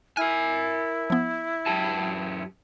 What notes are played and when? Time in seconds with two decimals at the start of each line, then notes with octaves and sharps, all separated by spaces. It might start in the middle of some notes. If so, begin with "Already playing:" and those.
0.17 E4 A#4 G#5 F6
1.10 F3 B3
1.66 F#2 G4 A5